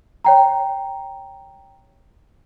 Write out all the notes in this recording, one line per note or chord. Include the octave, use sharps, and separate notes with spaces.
C#5 G5 A#5